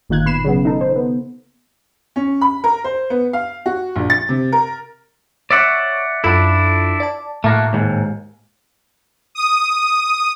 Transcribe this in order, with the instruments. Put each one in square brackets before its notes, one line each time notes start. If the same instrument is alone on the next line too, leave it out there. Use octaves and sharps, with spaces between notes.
[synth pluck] G1 A#2 D#3 F4 F#6 G#6
B2 B5 C7 E7
C#3 F#3 B3
D#4 A4
C5
B3
[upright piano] C#4
B5
A#4
C5
B3
F5
F#4
A#1
A6
C3
A#4
[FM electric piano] C#5 C#6 [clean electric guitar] D5 E5 F#5
[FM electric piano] F#2 F4 A4 [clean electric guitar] D4 E4
[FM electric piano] D5 A5
[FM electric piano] A2 [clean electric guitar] A3 A#3 F#4
[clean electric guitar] D#2 G#2
[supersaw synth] D#6